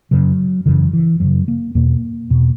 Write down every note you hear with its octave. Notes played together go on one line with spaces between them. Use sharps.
F#2 C#3 F#3
F#2 C#3 E3
E3
F#2 C#3 F#3
A#3
E2 B2 A#3
E2 B2